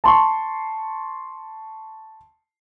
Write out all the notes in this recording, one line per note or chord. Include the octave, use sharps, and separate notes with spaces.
A5 C6 C#6